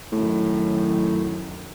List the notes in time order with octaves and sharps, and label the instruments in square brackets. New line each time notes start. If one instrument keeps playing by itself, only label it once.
[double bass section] F#2 D#3 [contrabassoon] A2